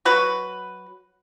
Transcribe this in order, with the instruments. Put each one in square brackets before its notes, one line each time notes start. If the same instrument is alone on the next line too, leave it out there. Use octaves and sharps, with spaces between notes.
[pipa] F#3 F#4 B4